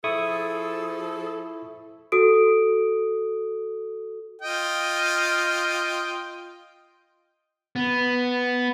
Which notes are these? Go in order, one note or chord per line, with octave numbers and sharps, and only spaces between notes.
F3 E4 G#4 A4 C#6 D#6
F#4 A4 D#6 D7
F4 D#5 G5
B3